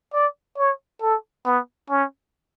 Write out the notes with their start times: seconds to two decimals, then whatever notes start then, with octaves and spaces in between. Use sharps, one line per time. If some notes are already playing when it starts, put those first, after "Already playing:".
0.13 D5
0.58 C#5
1.02 A4
1.46 B3
1.90 C#4